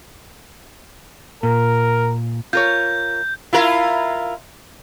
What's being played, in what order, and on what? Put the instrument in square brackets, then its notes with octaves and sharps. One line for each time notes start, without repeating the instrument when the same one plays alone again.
[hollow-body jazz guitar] A#2 [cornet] A#4
[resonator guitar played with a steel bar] F4 A#4 C#5 [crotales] G6
[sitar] E4 F4 A#4